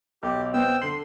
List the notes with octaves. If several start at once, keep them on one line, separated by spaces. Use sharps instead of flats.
B1 G4
B3 C4 G5 E6
D3 C6 C7 F#7